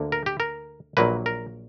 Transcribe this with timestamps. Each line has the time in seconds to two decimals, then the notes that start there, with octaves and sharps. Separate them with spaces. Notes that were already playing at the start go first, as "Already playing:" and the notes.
Already playing: D2 D3 A#3
0.12 A#4
0.26 G4
0.40 A#4
0.97 A#1 A#2 F#3 A#3 B4
1.26 A#4